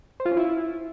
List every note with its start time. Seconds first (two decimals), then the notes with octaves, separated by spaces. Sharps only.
0.20 C5
0.26 F4
0.31 C#4
0.37 E4